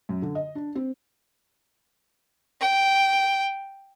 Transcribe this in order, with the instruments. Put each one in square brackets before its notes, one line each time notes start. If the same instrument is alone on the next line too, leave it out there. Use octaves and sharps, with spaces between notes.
[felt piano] F#2
D3
D#5
D4
C4
[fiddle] G5